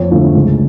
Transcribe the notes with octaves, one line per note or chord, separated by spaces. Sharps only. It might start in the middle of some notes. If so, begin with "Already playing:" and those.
Already playing: F2 C#5
D3 F3 A3
C#2